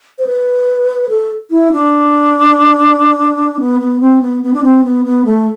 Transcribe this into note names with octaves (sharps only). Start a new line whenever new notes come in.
C5
B4
A4
E4
D4
B3
B3
C4
B3
B3
D4
C4
B3
B3
A3